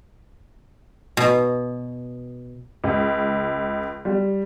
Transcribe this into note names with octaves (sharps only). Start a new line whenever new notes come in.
B2
C#2
G3